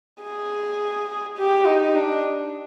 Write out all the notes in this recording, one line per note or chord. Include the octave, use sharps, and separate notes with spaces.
G#4
G4
D#4
D4